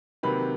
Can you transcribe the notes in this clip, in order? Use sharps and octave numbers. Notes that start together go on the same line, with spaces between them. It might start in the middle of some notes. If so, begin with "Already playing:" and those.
C3 D#3 F#3 A#3 B4 B5